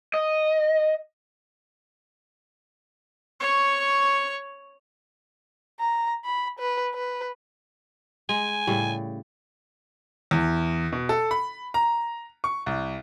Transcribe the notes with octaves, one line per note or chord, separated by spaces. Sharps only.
D#5
C#5 C#6
A#5
B5
B4
B4
G#3 G#5
A2 C#3 G3
E2
B2
A4
B5
A#5
C#6
C2